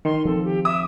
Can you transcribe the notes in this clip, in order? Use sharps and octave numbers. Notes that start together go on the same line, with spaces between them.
D#3 C6
F3 C4 A4
G4
E5 D6 D#6